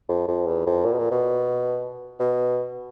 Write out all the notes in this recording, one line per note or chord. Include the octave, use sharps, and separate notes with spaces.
F2
F2
E2
F2
A#2
B2
A#2
B2
B2